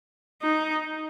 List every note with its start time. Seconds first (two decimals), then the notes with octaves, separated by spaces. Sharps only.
0.42 D#4